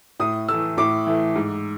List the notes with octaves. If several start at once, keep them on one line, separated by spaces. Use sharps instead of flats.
A2 D#6
E3 A3 E6
A2 D6
E3 A3
G#2